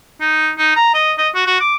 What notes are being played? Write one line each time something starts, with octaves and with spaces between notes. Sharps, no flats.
D#4
D#4
A#5
D#5
D#5
F#4
F#4
D6